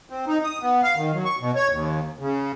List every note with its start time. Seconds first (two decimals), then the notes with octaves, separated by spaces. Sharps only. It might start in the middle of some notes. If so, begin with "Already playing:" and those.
0.10 C4
0.27 D#4
0.44 D#6
0.62 B3
0.83 F5
0.96 D#3
1.13 F#3
1.25 C#6
1.40 B2
1.56 C#5
1.70 D#2
2.19 C#3